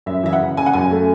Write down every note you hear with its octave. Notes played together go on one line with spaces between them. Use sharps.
F#2 E5
E3 E5
F#5
C#3
C#3 G#5
F#5
F#2 G#5
A3